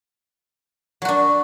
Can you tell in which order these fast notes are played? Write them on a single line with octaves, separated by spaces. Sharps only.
F#3 F#4 D4